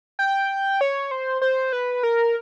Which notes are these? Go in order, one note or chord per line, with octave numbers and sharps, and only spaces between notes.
G5
C#5
C5
C5
B4
A#4